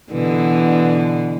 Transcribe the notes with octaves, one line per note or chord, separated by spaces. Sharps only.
B2 D3 E3